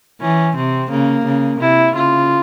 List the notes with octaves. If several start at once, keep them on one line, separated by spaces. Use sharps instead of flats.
E3 C#4
C3 C4
C#3 A#3
C#3
C3 E4
C#3 F4